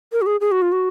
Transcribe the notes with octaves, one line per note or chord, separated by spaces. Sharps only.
A#4
F#4
G#4
G#4
F#4
F4
F#4